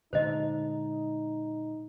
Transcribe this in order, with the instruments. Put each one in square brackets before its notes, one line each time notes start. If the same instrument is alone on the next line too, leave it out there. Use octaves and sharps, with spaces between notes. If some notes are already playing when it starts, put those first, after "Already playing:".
[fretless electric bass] A#2 D3 G#3 [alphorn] D#4 [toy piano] C5 D#5